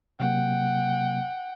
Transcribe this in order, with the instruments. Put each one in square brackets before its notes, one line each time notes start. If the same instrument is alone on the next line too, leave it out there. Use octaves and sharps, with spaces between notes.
[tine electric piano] C3 F#3 A#3 [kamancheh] F#5 G5